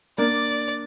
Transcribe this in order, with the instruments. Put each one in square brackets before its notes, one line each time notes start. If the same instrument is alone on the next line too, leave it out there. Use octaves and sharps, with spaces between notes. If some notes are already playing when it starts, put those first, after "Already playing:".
[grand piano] A#3 D4 [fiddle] D5